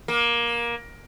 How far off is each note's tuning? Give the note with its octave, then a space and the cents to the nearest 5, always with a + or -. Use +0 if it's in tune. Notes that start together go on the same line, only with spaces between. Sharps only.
A#3 +20